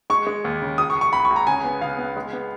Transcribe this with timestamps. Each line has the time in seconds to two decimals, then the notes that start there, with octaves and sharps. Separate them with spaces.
0.10 G#3 C#6
0.27 G#3
0.45 D#2
0.62 C#3
0.78 C#2 D#6
0.90 C#6
0.96 C#2
1.01 C#6
1.12 C#2 B5
1.25 C#6
1.30 C#2
1.36 A#5
1.47 C#3 G#5
1.64 B3
1.81 C#3 F5
1.98 B3
2.17 G#3
2.33 B3